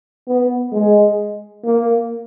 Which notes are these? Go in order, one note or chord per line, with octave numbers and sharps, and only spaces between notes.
B3
G#3
A#3